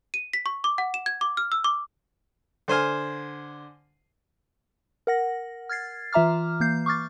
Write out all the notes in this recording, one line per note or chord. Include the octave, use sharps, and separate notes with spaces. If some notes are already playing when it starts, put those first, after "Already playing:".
D#7
B6
C#6
D6
F#5
E7
G#6
D6
F6
E6
D6
D3 C5 G#5 F6
A#4 F#5 A#6
F6 G#6 A6 C7
E3 F4 E5 A#5 D6 F6
E3 A#3 G6 C7
C#6 D6 F6 A6